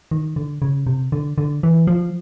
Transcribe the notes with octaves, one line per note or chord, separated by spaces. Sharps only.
D#3
D3
C#3
C3
D3
D3
E3
F3